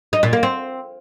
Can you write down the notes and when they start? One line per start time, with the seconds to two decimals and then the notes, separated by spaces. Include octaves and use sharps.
0.13 D#4
0.23 A#2
0.33 A#3
0.43 C4